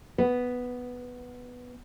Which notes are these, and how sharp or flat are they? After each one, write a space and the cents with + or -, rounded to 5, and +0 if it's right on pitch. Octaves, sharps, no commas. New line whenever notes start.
B3 +0 B4 +0